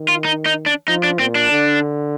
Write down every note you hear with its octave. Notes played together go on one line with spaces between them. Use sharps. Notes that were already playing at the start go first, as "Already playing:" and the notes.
Already playing: D#3
F4
D#4
D#4
D4
F3 D#4
D4
A#2 C4
D4
D3